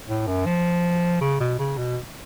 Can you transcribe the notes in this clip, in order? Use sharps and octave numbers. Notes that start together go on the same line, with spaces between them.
A2
F#2
F3
C#3
B2
C#3
B2